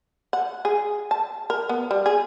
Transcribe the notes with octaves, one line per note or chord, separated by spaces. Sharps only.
F#5
G#4
A5
A#4
B3
G3
G#4